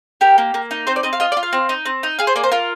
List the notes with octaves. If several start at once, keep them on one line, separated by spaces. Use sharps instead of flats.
G4 A#4
A#3
A#3
D#4
C4 C5
D5
C4 D#5
F5
F4 D#5
D5
F4
F5
C4
D#4
C4
D#4
G#4 F5
C5
A#3 D5
C5
F4 A#4